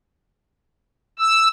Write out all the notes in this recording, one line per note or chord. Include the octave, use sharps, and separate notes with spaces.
E6